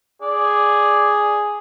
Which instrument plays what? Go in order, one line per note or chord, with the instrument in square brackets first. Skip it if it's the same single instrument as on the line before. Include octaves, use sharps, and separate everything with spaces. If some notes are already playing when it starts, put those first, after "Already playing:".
[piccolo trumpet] G#4 [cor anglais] D5